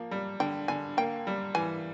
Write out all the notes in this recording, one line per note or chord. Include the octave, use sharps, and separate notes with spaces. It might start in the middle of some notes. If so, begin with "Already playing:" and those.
Already playing: F3 A#3
G3
D3 G5
D3 G#5
A#3 G5
G3
E3 G#5